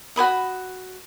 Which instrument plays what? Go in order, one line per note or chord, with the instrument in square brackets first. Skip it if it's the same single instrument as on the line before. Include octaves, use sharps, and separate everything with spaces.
[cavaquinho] F#4 C#5 B5 D#6